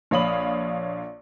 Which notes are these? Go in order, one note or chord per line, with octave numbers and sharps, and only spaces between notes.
A#1 C#5 F5 B5 D#6 F#7